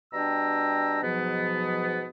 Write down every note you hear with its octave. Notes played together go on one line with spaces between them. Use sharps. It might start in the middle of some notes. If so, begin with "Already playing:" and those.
B2 G3 D4 G5 A#5 E6
G#2 B2 F3 F#3 B3